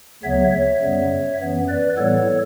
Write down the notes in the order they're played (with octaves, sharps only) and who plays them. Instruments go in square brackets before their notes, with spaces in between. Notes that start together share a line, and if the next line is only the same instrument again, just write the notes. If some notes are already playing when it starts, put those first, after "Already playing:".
[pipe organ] D2 C#3 F#3 B3 C#5 E5
C#5 E5
F#2 C#3 G3 B3
F#2 E3 B3
B4 D5
A2 E3 G3 B3 A4 C#5